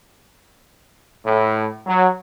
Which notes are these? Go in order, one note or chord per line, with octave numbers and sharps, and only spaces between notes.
A2
F#3